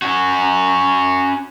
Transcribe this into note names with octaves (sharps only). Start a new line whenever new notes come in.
C#4 F#4